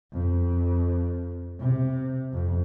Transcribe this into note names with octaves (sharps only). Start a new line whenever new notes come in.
F2
C3
F2